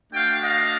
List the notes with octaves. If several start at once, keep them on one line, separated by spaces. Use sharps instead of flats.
A3 D4 F#4 F5 G5
D#5 F5